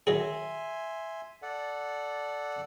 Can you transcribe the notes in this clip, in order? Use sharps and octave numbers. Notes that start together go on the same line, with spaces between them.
D#3 F#3 G#4 E5 G#5 C6
A4 D5 F#5